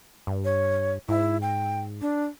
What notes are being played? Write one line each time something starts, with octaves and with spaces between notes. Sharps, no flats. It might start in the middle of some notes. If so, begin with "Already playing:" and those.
G2
C#5
G#2 E4
G5
D4